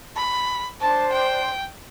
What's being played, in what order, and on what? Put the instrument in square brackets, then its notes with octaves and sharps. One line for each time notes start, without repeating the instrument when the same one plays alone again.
[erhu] B5
[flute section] D4 C5 [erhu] A5
[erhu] G5